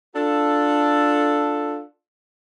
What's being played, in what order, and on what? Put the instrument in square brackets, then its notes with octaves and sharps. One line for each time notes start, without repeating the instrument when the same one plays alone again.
[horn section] D4 F4 A4